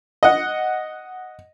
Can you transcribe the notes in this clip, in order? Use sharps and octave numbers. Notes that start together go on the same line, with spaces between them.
D#5 F#5